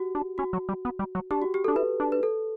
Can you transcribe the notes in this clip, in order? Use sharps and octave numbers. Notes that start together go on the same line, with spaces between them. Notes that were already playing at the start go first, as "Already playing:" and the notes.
Already playing: F#4 G4
D4
C#4 F#4
F#3
G3
B3
G3
F#3
D4 G4
F#4
G4
A4
D4
E4 B4
D4
B4
A4